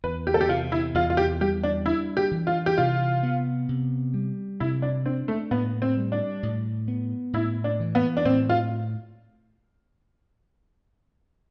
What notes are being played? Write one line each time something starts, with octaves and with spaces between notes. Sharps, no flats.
E2 B4
G4
A4
G4
C3 F4
E4
E2 F4
F4
G4
G3 G4
D4
D4 E4
G4
E3
F4
G4
C3 F4
B3
C3
G3
C3 E4
D4
C4 D4
A3
A2 B3
C4
G3
D4
A2
B3
A2 E4
D4
E3
B3
D4
A2 C4
F4